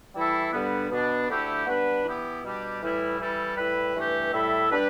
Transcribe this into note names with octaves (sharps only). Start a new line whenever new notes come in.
E3 G3 E4 A4 E5
G2 D3 G3 B3
B2 B3 D4
D2 D3 A3 E4 G4
G3 B3 D4 B4
E3 B3 E4 G4
B2 G3 D4 G4
A2 E3 G3 E4 B4
E3 G3 E4 A4
A2 G3 E4 B4
G2 E3 A3 G4
A2 G3 E4 A4 E5
G3 D4 G4 B4